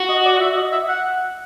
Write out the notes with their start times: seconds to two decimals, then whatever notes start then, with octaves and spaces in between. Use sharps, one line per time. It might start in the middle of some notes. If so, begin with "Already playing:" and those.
Already playing: F#4
0.09 D#5
0.25 D5
0.41 E5
0.56 D#5
0.72 E5
0.88 F#5